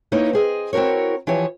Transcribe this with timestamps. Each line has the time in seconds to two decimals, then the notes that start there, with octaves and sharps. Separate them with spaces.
0.12 A#3 D#4 E4 B4 C#5 D#5
0.33 C4 G#4 D#5
0.73 C4 E4 F#4 A#4 C#5
1.27 E3 F3 E4 G4 C#5 G#5